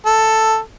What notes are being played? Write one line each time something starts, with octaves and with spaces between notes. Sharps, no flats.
A4